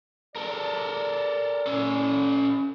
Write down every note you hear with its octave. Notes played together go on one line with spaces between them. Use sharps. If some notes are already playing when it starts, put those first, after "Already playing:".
A4 A#4 D5
C#4 A4